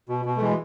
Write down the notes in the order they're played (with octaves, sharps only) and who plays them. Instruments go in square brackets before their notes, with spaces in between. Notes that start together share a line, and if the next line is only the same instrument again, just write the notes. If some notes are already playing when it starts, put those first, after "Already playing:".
[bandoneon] B2
B2
A3
E3 G#3